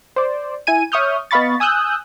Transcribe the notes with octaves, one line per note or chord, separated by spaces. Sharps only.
C5 D5
E4 G#5 D#7
C#5 E5 C#6 D#6 F6 G6
B3 D#5 F5 B5 C#6 A6
G#5 D#6 E6 F#6 G6